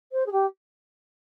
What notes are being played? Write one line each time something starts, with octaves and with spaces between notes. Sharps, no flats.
C5
G#4
G4